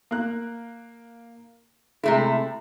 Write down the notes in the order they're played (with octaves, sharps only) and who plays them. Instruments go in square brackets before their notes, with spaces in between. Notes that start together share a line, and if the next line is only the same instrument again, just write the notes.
[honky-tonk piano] A#3 F#6
[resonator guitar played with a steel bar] C3 A3 E4 [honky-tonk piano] G#3